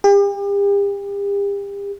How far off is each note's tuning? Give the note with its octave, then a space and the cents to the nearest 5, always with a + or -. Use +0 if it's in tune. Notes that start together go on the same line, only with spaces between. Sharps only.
G4 +40